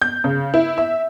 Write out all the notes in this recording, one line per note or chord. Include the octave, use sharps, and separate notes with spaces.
G6
C#3
E4
E5